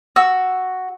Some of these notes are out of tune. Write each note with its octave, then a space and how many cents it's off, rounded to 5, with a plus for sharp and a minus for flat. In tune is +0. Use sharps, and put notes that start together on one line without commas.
F#4 +0 E6 +0